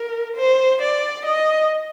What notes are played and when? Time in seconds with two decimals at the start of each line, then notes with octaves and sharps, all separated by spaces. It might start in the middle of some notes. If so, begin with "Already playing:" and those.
Already playing: A#4
0.36 C5
0.81 D5
1.25 D#5